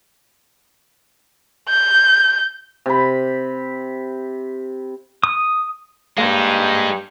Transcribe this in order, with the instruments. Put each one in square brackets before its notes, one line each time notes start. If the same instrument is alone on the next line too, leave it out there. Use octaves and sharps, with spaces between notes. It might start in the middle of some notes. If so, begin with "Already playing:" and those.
[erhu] G6
[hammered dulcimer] C3 B5
[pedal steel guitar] D#6
[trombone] G2 [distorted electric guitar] G#3 D#4 [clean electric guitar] A#3 A4 F5